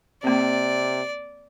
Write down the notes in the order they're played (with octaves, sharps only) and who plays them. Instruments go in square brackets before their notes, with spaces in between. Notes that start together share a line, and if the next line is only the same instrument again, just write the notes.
[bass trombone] C3 [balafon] A#3 C4 [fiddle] D5